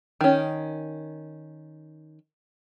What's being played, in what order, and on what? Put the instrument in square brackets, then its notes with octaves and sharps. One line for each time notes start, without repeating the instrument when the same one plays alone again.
[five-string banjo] D#3 C#4